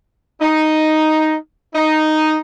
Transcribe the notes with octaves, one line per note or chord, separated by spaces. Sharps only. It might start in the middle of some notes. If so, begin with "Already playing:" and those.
D#4
D#4